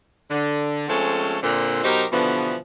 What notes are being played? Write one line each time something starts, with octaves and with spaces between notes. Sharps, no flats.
D3
F3 G#3 A3 C4 C#4 A4
A#2 D3 C4
B2 F#3 D#4 G4 A#4 C5
B2 D3 E3 F3 G3 B3